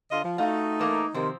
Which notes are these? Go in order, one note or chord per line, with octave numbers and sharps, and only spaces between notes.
D3 F4 D#5
F3
A3 D#4 F4 F#4
E3 A#3 A#4
C3 D#3 F3 C4